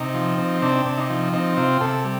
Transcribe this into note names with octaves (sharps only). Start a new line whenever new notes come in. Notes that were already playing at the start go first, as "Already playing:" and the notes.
Already playing: C3 D#4
F3
C4
C3 D4
C3
D#4
F3
C4 D#4
C3 F4
C3 A4
G3